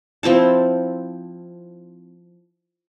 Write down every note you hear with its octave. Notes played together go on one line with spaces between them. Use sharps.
F3 C4 E4 A5